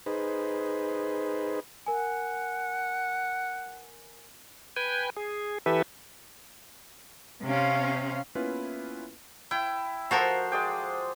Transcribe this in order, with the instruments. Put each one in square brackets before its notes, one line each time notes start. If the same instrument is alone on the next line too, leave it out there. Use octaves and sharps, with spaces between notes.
[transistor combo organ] D#4 G#4 B4 C5
[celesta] A#4 G#5 [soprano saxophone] F#5
[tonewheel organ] B4 G5 G#5
G#4
E3 G4 A4 B4 E5
[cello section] C3 C4 C#4 F5
[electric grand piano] A#3 B3 C#4 E4 F4 B4
[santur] E4 [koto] G5
[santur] F3 C5 C6 [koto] F#4 A4 A#4
[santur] G#3 D5 G5